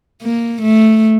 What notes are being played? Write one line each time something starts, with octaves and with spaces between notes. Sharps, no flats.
A#3
A3